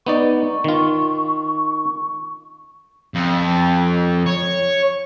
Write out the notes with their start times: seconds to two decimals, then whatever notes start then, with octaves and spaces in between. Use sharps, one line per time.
0.06 B3 D#4 D5 C#6
0.64 D#3 F4
3.14 F2
4.26 C#5